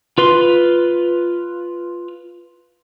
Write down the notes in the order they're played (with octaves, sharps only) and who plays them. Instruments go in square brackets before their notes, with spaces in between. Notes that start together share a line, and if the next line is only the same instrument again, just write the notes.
[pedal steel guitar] F4 B4 C6